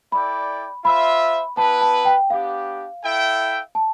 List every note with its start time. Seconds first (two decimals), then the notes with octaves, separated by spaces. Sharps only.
0.12 E4 A4 D5 G5 B5
0.85 F4 C5 E5 B5
1.57 B3 E4 B4 A5
1.81 A5
2.05 G5
2.30 B3 D4 G4 F5
3.03 E4 A4 E5 G5
3.75 A5